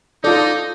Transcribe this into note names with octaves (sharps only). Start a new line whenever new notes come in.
D#4 F4 A4 D5